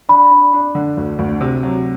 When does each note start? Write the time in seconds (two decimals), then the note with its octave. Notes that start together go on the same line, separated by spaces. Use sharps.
0.09 D4 B5
0.31 D4
0.53 D4
0.75 D3
0.97 D2
1.19 D2
1.41 C3
1.63 F#3